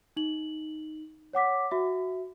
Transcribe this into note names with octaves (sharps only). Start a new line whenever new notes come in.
D#4 F#7
C#5 F#5 D6 B6
F#4 E5